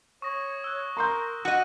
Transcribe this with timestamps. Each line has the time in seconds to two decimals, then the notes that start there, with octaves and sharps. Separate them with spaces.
0.22 C#5 C#6 D#6 A#6
0.64 E6 F#6
0.97 A#4 A#5 C6 G6
1.45 F#4 D#5